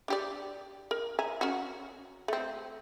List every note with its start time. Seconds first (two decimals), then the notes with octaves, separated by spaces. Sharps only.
0.08 D4 G4 D5
0.91 A#4
1.19 E5 G#5 A#5
1.41 C#4 F#4
2.28 A3 C4